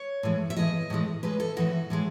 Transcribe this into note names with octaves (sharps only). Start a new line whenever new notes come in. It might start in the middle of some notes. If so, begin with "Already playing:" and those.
Already playing: C#5
A2 E3 G#3
E5
A2 E3 G#3 D#5
A2 E3 G#3
A2 E3 G#3 B4
A4
A2 E3 G#3 F#4
A2 E3 G#3